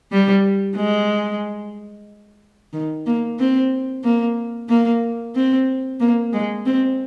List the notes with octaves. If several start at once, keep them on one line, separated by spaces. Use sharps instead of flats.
G3
G#3
D#3
A#3
C4
A#3
A#3
C4
A#3
G#3
C4